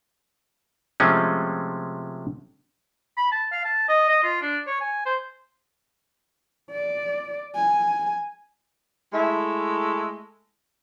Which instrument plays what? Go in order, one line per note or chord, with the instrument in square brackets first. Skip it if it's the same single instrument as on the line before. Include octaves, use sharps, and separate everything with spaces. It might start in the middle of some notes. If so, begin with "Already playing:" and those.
[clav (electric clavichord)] C3 F3 G#3 A3 C4 C#4
[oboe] B5
A5
F5
A5
D#5
D#5
F4
D4
C#5
G#5
C5
[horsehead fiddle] D5
G#5
[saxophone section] G#3 A3 E4 E5